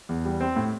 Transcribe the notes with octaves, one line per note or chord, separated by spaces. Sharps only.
E2
G3
C4
A2